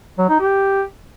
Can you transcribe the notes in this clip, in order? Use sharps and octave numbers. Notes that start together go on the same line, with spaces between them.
F#3
D#4
G4